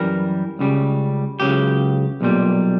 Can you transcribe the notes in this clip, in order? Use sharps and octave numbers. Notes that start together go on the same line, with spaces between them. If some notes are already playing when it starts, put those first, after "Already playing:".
Already playing: F#2 E3 G3 A#4
C#2 C#3 G3
C#2 C#3 F#3 G4
B1 A#2 G3